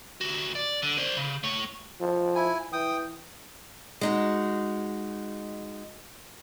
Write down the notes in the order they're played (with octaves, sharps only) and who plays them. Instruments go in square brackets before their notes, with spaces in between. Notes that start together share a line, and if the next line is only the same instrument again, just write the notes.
[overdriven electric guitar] D2 F#4
D5
D3
C5 D5
C#3
A3 C#5
[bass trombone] F3
[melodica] E4 G#5
[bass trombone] E3 [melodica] G5 D#6
[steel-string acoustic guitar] G#3 D#4 F#4